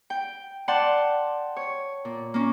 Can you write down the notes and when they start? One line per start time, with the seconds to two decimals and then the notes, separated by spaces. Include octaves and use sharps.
0.10 G5
0.68 D5 F#5 G5 A5 C6
1.56 C#5
2.05 A#2
2.34 A#3 C#4